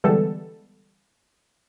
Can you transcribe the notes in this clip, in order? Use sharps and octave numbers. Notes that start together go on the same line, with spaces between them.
D3 E3 G3 G#3 B3 A4